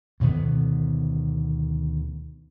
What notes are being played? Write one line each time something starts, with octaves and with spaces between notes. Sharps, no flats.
D2 B2 D#3 B3